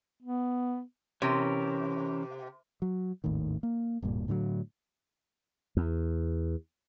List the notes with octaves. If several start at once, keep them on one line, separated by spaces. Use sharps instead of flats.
B3
C3 E3 C#4 A#4
F#3
G#1 D#2 A2 D#3
A#3
D1 G2 A#2
A2 D3 D#3 F#3
E2